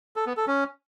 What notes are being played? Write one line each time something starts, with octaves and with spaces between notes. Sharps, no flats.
A4
B3
A4
C#4